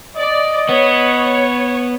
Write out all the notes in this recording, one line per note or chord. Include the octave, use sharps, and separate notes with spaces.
D5 D#5
B3 C#5